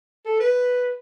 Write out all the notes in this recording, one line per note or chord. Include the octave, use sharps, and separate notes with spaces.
A4
B4